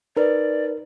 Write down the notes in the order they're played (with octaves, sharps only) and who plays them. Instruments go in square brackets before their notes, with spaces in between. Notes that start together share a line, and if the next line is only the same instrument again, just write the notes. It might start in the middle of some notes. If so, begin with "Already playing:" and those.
[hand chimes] D#4 B4 [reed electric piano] A#4 [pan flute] D5